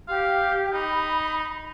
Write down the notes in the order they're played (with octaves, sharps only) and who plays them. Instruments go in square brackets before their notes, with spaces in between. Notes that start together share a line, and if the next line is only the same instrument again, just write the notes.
[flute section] G4 [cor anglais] F5
[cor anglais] D#4 [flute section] B5